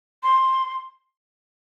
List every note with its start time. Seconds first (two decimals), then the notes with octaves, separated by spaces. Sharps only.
0.23 C6